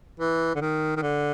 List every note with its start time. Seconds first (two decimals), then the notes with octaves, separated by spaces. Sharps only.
0.20 E3
0.55 D3
0.61 D#3
0.97 D#3
1.02 D3